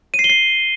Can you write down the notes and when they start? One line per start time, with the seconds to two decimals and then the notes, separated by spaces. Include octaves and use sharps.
0.14 D#7
0.19 C7
0.24 G7
0.30 C7